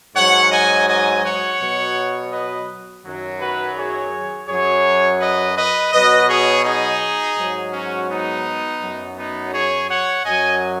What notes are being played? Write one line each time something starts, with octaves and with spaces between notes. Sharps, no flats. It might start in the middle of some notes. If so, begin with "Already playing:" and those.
G#2 F#3 C#5 F#5
D#5 G#5
D#5 G#5
C#5 F#5
B2 F#3
B4 D#5
F#2 D#3 F#3
F#4 B4
G#4 C#5
F#2 F#3 G#4 C#5
B4 D#5
B4 D#5
B2 F#3 B4 D#5
G#4 C#5
D#4 G#4
G#2 F#3
C#4 F#4
B3 D#4
F#2 F#3
B3 D#4
G#4 C#5
C#5 F#5
F#2 F#3 D#5 G#5